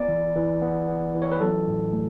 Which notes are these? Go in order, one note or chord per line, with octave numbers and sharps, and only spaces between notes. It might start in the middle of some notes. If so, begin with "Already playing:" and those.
Already playing: B3 D5
E3
E3
B3
B3
E3
C#5
B4
F#3 A4
A2
A3